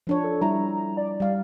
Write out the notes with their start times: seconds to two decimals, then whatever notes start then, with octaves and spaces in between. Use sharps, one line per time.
0.07 F3 D4 C#5
0.24 A4
0.41 G3 E4 A#5
0.97 D5
1.20 G3 F5